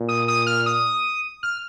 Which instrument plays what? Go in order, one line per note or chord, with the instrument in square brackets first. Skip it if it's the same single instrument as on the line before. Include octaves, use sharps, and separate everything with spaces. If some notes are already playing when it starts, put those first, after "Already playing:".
Already playing: [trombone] A#2
[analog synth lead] D#6
D#6
F6
D#6
F6